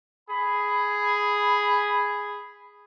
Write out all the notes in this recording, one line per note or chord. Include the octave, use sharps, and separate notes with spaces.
G#4 B5